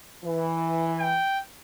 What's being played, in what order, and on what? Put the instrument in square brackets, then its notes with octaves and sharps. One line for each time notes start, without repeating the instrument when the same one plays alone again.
[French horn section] E3
[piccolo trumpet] G5